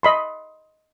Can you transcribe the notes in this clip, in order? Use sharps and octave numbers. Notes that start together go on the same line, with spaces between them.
D#5 B5 C6